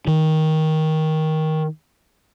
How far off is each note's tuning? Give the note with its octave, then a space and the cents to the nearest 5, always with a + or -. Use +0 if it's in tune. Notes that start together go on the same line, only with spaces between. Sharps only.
D#3 +10